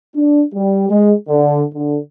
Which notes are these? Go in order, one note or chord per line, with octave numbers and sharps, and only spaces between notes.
D4
G3
G#3
D3
D3